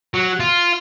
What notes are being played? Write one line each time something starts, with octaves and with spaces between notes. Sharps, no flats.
F#3
F4